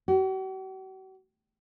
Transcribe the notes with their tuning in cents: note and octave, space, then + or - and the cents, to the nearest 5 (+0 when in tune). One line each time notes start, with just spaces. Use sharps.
F#4 +45